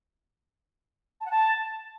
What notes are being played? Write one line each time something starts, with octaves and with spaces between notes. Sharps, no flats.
A5
F#5
A5